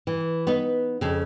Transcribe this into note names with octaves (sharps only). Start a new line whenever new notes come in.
E3
B3 D#4 B4
F2 C#3